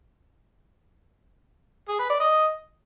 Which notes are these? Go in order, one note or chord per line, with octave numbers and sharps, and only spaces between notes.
G#4
B4
D5
D#5